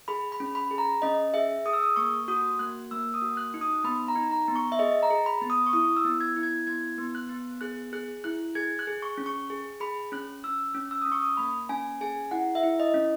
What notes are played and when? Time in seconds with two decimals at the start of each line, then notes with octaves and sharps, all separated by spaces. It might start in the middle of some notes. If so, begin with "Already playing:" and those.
0.08 G#4 B5
0.32 B5
0.40 C#4
0.55 B5
0.71 G#4
0.78 A#5
1.02 C#4 D#5
1.34 G#4 E5
1.66 G#4 D#6
1.73 E6
1.83 D#6
1.96 A#3 C#6
2.28 F#4 D#6
2.59 A#3 F#6
2.91 A#3 E6
3.14 D#6
3.22 F#4
3.37 F#6
3.54 D#4
3.61 D#6
3.84 B3 B5
4.08 A#5
4.16 D#4
4.31 A#5
4.48 B3
4.56 C#6
4.72 E5
4.79 G#4 D#5
5.03 A#5
5.10 G#4
5.26 B5
5.41 B3
5.50 D#6
5.66 C#6
5.73 E4 D#6
5.97 E6
6.05 B3
6.21 G#6
6.36 E4
6.43 G#6
6.67 B3 G#6
6.98 B3
7.15 F#6
7.29 B3
7.61 G#4 F#6
7.93 G#4 F#6
8.24 E4 F#6
8.55 G#4 G#6
8.79 F#6
8.87 G#4
9.02 C#6
9.18 C#4
9.26 C#6
9.50 G#4
9.80 G#4 B5
10.12 C#4 F#6
10.44 C#4 E6
10.75 C#4
10.91 E6
11.02 C#4 D#6
11.12 C#6
11.22 D#6
11.37 A#3 B5
11.69 C#4 G#5
12.01 G#4 G#5
12.31 E4 F#5
12.55 E5
12.63 E4
12.80 D#5
12.94 C#4